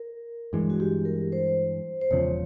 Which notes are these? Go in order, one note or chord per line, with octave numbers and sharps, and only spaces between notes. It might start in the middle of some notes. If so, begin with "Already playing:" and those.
Already playing: A#4
G2 E3 G#3
F#4
G4
A#4
C5
C5
E1 E2 C#3 F3 C#5